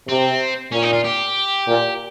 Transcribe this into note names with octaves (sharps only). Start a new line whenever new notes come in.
C3 C4
A#2 C#4
D#4
F4
G4
A#2